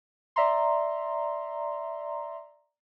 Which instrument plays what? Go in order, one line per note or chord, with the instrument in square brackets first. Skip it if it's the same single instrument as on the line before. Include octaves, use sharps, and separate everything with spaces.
[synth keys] D5 E5 A#5 C6